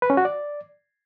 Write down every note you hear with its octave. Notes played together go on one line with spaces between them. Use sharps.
B4
C#4
F#4
D5